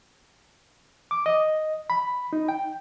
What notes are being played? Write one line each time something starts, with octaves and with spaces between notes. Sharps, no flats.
D6
D#5
B5
D#4
G5